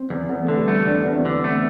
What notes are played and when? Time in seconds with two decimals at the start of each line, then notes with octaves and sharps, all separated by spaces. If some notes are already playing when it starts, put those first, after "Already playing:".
Already playing: C4
0.10 E2
0.29 E2 B3
0.44 A3
0.48 D3
0.58 G3
0.68 A3
0.86 E2 D4
1.05 E2 B3
1.15 C4
1.25 D3
1.44 A3 B3